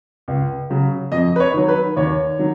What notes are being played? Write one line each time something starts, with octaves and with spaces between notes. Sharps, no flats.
C#2
C#3 F#3
F2 D#5
B4
C#5
D#3 F#3
B4
D#2 C#5
D#3 F#3